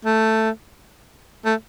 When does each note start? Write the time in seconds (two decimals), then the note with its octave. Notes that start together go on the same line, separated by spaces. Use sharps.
0.05 A3
1.45 A3